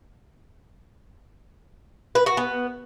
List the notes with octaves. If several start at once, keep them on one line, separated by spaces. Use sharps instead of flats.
B4
F#4
B3